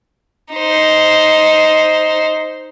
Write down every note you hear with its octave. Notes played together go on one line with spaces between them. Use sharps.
D#4 C5